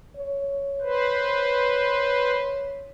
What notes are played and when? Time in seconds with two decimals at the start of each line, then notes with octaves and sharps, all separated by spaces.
0.16 C#5
0.81 B4 C5